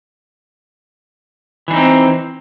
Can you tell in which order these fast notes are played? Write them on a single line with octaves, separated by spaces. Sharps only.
E3 D4 D#4 C4